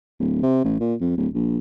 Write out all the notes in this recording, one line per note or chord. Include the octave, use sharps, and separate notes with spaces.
D1
C3
A1
A#2
F2
D1
A#1